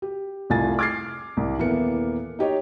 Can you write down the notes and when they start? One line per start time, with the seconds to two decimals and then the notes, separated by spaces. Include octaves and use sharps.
0.02 G4
0.50 F1 C2 F4 G#5 A6
0.79 D6 F6 G#6 A6 C7
1.37 C2
1.58 D#1 E3 A#3 B3 C#7
2.39 D#4 G4 C#5 D#5